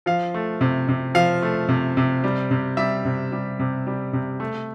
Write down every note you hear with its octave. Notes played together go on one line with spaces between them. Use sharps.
F3 F5
A3
C3
C3
F3 F5
A3
C3
C3
G3
C3
G3 E5
C3
G3
C3
G3
C3
A3